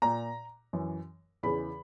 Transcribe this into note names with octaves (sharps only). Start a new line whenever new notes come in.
A#2 A#5
F#2 E3
E2 C#3 E3 B5